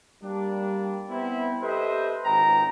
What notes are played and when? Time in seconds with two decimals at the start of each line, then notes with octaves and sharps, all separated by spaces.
0.23 G3 A#3 D4
1.10 B3 C4 E4
1.62 G4 A4 B4 C5 D#5 E5
2.25 G#1 C#2 G5 A#5